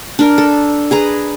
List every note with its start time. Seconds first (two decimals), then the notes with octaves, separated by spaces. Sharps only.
0.19 D4 A#4
0.38 A4
0.91 G#4 B4 A#5